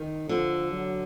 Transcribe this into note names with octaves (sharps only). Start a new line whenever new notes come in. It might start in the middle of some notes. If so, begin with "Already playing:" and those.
Already playing: D#3
D3 F3
F#3